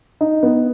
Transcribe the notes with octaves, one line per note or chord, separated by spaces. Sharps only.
D#4
B3